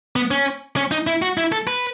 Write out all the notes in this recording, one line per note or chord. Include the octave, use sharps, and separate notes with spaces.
B3
C#4
C#4
D#4
E4
F#4
E4
A4
B4